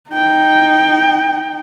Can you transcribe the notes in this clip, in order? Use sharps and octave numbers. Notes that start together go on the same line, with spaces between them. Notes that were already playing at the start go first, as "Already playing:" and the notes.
D#4 G5